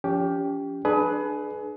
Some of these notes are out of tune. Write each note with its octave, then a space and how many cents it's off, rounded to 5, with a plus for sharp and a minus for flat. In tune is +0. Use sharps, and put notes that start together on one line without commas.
F3 +0 C#4 +35 G4 +0
D4 +25 G#4 +30 B4 +0